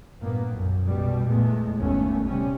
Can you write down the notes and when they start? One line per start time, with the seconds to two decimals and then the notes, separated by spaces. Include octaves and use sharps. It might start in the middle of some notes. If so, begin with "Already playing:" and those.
0.20 G2 A#2 A#3 B3
0.50 B1 F#2
0.84 B1 B2 G3
1.27 E2 A#2 G#3 A3 B3
1.79 G1 D#2 A3 B3 C#4
2.25 C3 G3 C#4